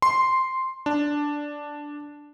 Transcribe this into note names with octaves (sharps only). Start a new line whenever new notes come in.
C6
D4